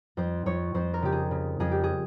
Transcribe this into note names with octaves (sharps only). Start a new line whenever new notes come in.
F2 C5
F2 C#5
F2 C5
A#4
C#3 G4
G#4
C#3
F2 G#4
G4
G#4